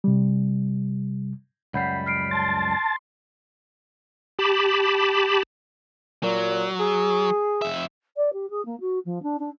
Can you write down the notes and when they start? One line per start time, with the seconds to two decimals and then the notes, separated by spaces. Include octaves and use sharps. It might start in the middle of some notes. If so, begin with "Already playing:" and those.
0.04 C3 G3
1.74 C#2 F#2 G3 F#5 B5 G6 C7
2.06 F6 C7 D7
2.31 A5 C6
4.39 G4 A5 B5
6.23 A#2 F#3
6.79 G#4
7.62 F2 E5
8.17 D5
8.33 G4
8.50 G#4
8.66 A#3
8.80 F#4
9.05 F3
9.23 D4
9.39 D4